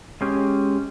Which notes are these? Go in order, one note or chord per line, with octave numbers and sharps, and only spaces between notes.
G#3 C#4 G4